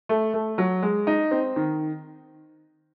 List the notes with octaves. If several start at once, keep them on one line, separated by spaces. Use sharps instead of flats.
A3
A3
F#3
G#3
D#4
C4
D#3